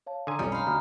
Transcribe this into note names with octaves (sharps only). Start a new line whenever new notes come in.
C#5 F5 A5
D3 G#5 A#5 C6 D#6
B1 F2 G3 C#4
D#4 F5 B5 C6
D2 F#4 B5 F6